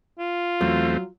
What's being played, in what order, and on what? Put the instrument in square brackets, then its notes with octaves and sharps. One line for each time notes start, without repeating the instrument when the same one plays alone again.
[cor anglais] F4
[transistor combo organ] E2 A3 C4 [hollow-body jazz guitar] F#3